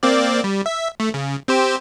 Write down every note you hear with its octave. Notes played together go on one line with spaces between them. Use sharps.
A#3 C4 D5
G3
E5
A3
C#3
C4 G4 C5